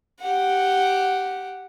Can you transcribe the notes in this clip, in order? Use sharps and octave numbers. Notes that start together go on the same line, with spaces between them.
G4 F#5